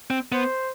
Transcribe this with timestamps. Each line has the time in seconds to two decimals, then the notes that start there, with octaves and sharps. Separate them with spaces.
0.10 C4
0.32 B3 C5